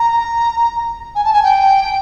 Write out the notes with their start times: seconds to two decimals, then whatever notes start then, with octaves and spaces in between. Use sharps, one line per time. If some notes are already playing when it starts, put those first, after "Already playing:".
Already playing: A#5
1.15 G#5
1.24 A5
1.32 G#5
1.43 G5